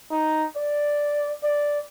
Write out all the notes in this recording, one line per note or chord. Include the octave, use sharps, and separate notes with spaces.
D#4
D5
D5